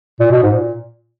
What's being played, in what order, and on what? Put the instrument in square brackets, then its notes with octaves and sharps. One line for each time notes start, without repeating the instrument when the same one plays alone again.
[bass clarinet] A#2
B2
G#2
A#2